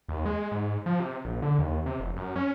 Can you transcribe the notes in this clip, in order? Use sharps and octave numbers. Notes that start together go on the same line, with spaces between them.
D#2
G#3
G#2
F3
C3
A#1
D3
D#2
C3
F1
F#2
C#4